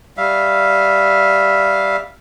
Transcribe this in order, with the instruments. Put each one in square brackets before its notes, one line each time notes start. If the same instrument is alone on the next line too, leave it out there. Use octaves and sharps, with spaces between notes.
[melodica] G3 E5 F5